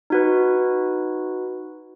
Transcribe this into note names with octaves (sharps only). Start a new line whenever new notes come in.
D#4 F#4 B4